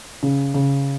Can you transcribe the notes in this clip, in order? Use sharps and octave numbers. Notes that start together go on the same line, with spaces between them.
C#3
C#3